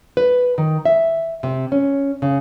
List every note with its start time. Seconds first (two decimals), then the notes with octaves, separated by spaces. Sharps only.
0.17 B4
0.58 D#3
0.85 E5
1.43 C3
1.72 C#4
2.22 C#3